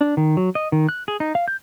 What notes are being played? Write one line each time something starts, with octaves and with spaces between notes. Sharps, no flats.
D4
D#3
F#3
D#5
D#3
F#6
G#4
D#4
F5
G6